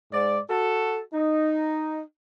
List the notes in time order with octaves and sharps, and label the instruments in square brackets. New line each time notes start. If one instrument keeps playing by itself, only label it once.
[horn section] G#2 D5
F#4 A4
D#4